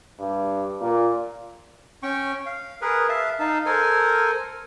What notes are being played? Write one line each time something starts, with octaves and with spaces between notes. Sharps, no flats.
G2
A#2
C#4 G5 C#6
F5
G#4 A#4 B4
E5 F5 A5
D#4 F5 A5
A4 A#4 C5 G#5